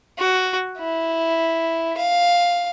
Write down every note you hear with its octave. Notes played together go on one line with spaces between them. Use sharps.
F#4
E4
F5